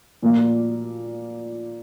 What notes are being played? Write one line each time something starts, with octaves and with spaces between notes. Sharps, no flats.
A#2 F3 A#3